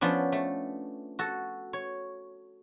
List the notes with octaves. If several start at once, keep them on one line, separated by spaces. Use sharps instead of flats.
F3 B3 C#4 D4
A3
F#4 A4
C#5